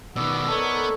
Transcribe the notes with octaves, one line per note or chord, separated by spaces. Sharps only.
B2 D#3 B3 D5 C#6 E6
B3 D#4 A4 A#4 C#5 A#5